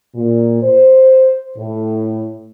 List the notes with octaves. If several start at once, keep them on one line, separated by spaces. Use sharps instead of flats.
A#2
C5
A2